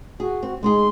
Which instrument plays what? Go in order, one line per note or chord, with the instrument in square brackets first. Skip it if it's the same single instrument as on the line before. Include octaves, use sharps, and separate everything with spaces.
[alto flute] F#4 [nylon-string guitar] G#4
[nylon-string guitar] C4
[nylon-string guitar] G#3 D#4 G#4 [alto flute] C6